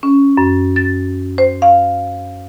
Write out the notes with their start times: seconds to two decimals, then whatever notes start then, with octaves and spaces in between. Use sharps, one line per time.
0.03 C#4
0.37 F#2
0.76 A6
1.38 C5
1.62 F5